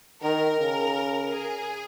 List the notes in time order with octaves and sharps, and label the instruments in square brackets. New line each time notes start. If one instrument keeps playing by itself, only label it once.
[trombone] D#3 [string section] A#4
[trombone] C#3
[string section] G#4